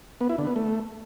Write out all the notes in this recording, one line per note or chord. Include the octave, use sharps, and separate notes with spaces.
B3
E4
D3
B3
A3